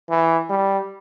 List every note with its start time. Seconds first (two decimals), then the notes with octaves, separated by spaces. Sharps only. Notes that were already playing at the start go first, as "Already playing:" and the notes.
0.10 E3
0.50 G3